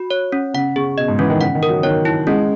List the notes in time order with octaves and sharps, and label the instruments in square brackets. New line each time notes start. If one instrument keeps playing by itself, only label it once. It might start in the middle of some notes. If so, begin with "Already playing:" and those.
Already playing: [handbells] F#4
C#5
C#4
[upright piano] C#3 [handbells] F#5
[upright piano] C#3 [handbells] G#4
[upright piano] B2 [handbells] D#5
[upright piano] G#2
[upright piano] E3 [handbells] C#4
[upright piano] D#3
[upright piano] C#3 [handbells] F#5
[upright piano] D#3
[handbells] A#4
[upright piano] F#3
[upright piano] D#3 [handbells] C#5
[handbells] E4
[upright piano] G#3 [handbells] C#4